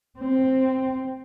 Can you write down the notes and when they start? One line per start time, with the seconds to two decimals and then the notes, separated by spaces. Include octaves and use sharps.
0.19 C4